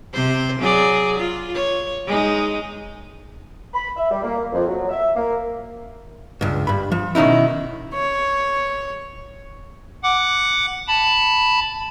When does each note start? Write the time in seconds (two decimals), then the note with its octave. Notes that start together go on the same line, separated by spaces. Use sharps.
0.13 C3 C5
0.59 F#3 G#4 D5
1.19 F4
1.55 C#5
2.06 G#3 D#4
3.74 B5
3.97 E5
4.11 G3
4.24 A#3
4.53 F2
4.68 F#3
4.89 E5
5.15 A#3
6.41 C#2 G2
6.67 G2 B5
6.92 F3
7.15 B2 D#3 C#4 D#4 E4
7.94 C#5
10.03 F#5 D6
10.88 A5 B5